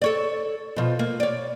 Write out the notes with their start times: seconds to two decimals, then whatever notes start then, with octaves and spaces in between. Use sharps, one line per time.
0.02 A4 C#5 D5
0.76 B2 F3
0.99 A#3
1.20 C#5 D5